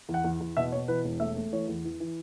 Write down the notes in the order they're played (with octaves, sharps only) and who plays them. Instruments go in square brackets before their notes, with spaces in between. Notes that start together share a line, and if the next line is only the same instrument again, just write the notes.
[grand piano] E2
F#5
E2
E2
B2 E5
B2 C#5
E3 B4
E1
A3 E5
A3
E3 C#5
E2
E3
E3